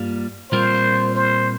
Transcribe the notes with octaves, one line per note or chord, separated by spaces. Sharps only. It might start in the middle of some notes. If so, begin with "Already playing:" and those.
Already playing: G2 G3 A#3 F4
A#2 G3 C4 F4 A#4 C5
C5